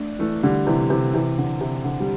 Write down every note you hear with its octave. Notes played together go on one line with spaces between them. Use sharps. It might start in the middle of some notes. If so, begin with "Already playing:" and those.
Already playing: A3 D4
E3 A3
D3 G3
C3 E3
C3 E3
C3 E3
D3
C3
D3
G3